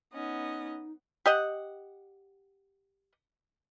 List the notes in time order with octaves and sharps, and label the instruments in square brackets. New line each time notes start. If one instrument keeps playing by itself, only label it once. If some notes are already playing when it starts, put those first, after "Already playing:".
[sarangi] B3 [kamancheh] C#4 D#5 [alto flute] D#4
[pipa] G4 D#5 F#5